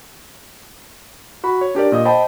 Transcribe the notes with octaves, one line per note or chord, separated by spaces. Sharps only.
F#4 B5
C#5
D4 G4 A#4 D5
A#2 D#5 D#6
C5 D#5 G5 A5 B5